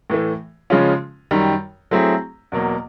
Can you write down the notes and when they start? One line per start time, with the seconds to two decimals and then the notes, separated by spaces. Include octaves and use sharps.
0.10 A2 E3 A3
0.70 C#3 F3 G#3 C#4 F4
1.31 F#2 D#3 G3
1.91 F#3 A3 C4 E4 G#4
2.52 E2 B2 F#3 A#3